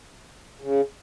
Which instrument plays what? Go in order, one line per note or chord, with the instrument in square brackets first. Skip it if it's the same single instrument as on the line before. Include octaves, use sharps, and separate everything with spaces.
[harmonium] C#3